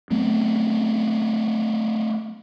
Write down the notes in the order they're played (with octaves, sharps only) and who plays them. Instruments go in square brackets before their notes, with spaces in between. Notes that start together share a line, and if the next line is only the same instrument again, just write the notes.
[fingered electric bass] F#3 A3 B3 C4